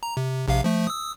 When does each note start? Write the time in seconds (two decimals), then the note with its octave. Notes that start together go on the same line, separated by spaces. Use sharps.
0.03 A#5
0.17 C3
0.48 A#1 C3 F5
0.64 F3 A3
0.87 D#6 E6